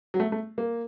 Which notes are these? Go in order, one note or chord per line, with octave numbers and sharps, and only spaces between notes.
F#3
A3
A3
A#3